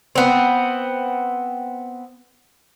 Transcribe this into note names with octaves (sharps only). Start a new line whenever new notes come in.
B3 C4